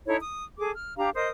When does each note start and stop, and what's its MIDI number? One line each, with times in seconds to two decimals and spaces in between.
0.08 0.16 63
0.08 0.16 64
0.08 0.16 69
0.08 0.16 73
0.21 0.44 87
0.59 0.71 68
0.59 0.71 69
0.59 0.71 86
0.75 0.97 89
0.97 1.10 62
0.97 1.10 67
0.97 1.10 77
0.97 1.10 82
1.15 1.29 70
1.15 1.29 72
1.15 1.29 75
1.15 1.29 87